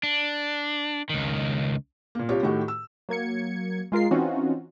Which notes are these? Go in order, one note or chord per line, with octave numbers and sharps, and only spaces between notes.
D4
C#2 D#3
A#2 A#3
C2 F4 G4 C#5
A2 D#3 A3 F#4 G4
E6
F#3 A#3 G#6 C#7
G#3 F4 A#4 C7
E3 C4 C#4 D#4 F4 F#4